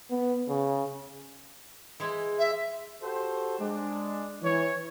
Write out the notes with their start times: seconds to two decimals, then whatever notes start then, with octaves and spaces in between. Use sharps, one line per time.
0.11 B3
0.49 C#3
2.00 E3 G#3 E4
2.38 E5
3.02 F#4 G4 A4 C5
3.59 G#3 D4
4.42 E3 C#5